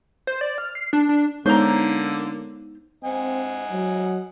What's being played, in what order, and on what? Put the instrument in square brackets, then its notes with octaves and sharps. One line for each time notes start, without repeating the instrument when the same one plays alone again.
[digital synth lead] C5
D5
F6
C7
D4
D4
[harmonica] D3 A#3 [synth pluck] G#3 B3 C#5 [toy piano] D#4 [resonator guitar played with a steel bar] C5 A#5
[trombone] C4 [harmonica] D#5 F#5 G#5
[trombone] F#3